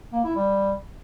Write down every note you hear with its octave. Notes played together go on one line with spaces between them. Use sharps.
A#3
E4
G3